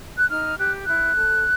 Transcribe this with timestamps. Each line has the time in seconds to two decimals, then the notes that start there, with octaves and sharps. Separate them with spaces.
0.18 F#6
0.29 D#4 F6
0.58 G4 F#6
0.85 E4 F#6
1.16 A4